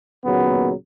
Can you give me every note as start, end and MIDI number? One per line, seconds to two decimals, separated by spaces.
0.25 0.71 39
0.25 0.71 46
0.25 0.71 49
0.25 0.71 54
0.25 0.71 59